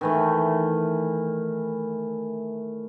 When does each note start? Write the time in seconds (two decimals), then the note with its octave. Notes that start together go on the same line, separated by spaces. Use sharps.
0.01 D#3 E3 A3